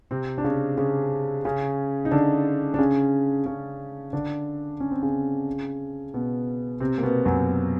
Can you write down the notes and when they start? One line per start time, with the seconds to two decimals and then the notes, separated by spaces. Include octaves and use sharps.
0.11 C3 C4
0.38 D4
0.44 C#3 C#4
0.78 C#3 C#4
1.45 C#3 C#4
2.05 D#4
2.11 D3 D4
2.74 D4
2.79 C#3 C#4
3.46 C#3 C#4
4.13 D3 D4
4.80 C#4
4.91 C4
5.02 C#3 C#4
6.14 B2 B3
6.80 C3 C4
6.98 A#3
7.03 B2 B3
7.25 F#2 F#3